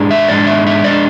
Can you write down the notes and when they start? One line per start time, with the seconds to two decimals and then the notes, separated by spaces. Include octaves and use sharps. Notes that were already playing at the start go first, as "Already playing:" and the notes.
Already playing: G#2 G#3 D4
0.11 E5
0.29 G#2 G#3 D4 D5
0.47 E5
0.67 E5
0.84 G#3 D4 D5